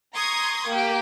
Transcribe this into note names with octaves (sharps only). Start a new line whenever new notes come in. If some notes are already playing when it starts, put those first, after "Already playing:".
A#5 C6 C#6 D#6 G#6
A#3 G4